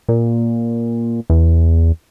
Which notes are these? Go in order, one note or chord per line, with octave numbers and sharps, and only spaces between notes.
A#2
E2